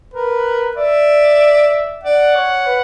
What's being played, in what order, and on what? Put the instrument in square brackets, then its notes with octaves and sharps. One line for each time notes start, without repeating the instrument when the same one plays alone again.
[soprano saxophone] A#4 [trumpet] B4
[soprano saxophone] D5 [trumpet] E5
[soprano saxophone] D5 [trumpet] F#5
[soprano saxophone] C#5
B4